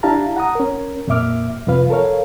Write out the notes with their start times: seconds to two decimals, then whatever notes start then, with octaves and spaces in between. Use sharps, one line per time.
0.03 D4 E4 G4 F5 A5 A#5
0.36 F#5 A#5 D#6
0.55 C#4 A#4
1.07 F2 A#2 A#3 E5 D6 F6
1.67 F2 C3 F3 F4 B4 F5
1.90 A4 A#4 C#5 F5